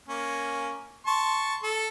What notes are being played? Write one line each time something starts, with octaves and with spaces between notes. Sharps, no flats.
A#3 C#4
A5 C6 C#6
A4